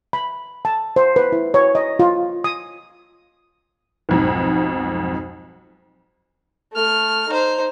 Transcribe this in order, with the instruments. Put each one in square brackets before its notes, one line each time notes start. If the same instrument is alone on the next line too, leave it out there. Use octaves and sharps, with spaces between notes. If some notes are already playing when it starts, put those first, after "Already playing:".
[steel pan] B5
A5
C5
B4
E4
C#5
D#5
F4
D#6
[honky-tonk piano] B1 F2 G#2
[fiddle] A3 F6
D#4 C5